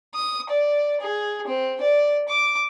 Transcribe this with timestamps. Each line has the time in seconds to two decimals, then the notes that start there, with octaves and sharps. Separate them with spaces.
0.15 D#6
0.50 D5
1.01 G#4
1.48 C4
1.82 D5
2.29 D6